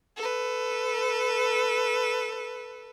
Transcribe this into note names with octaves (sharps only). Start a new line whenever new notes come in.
A4 B4